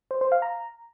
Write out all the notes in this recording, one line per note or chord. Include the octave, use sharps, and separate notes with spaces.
C5
C5
F5
A#5